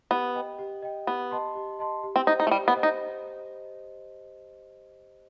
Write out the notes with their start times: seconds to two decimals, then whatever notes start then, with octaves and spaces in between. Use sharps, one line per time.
0.10 B3 G4
0.35 D#5 G5
0.59 G4
0.82 D#5 G5
1.07 B3 G4
1.31 D#5 A5 C6
1.55 G4
1.79 D#5 A5 C6
2.03 G4
2.16 C4
2.27 D#4 C5 D#5
2.40 D#4
2.47 A3
2.51 G3 G4
2.68 B3
2.76 C5 D#5
2.83 D#4